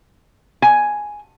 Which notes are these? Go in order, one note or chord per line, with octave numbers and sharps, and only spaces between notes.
G#5